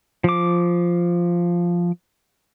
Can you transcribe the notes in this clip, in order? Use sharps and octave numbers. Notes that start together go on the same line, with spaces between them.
F3 D6